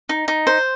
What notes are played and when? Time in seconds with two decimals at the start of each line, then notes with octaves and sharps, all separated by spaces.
0.09 D#4
0.28 D#4
0.47 C5